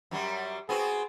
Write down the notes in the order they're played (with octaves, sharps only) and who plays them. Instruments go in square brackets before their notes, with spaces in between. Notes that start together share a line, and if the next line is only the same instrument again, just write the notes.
[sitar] F#2 F#3 G3
[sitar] B3 C4 F#4 [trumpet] G#4